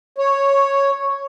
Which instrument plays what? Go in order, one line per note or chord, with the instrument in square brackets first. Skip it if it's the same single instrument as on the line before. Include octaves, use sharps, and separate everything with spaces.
[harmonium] C#5